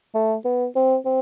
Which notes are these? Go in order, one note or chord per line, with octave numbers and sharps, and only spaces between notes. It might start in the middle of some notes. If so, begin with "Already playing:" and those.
A3
B3
C4
C4